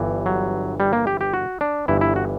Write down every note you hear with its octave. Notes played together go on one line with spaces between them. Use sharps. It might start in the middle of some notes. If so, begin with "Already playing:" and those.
Already playing: G1 G2 E3
F#3
G3
A#3
G4
G4
F#4
D4
G1 G2 E3 E4
E4
F#4